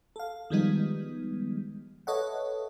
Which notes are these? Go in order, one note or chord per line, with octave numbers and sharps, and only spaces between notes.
A4 F5
D#3 F3 G3 G#3 B3 D#4
A4 B4 C#5 D#5 E5 F#5